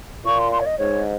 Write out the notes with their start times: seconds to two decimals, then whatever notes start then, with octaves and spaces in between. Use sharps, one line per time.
0.25 A#2 C#6
0.39 C6
0.51 C6
0.60 C#5
0.66 D#5
0.78 G#2 C#5